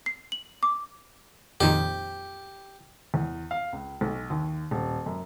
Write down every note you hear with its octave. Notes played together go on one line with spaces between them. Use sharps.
C7
F#7
D6
F2 A#2 D#3 G4
E2
F5
C#2
B1
D#2
D#1
F#2